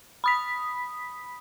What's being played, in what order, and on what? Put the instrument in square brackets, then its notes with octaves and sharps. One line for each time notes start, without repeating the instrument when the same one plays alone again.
[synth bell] B5 D#6 B6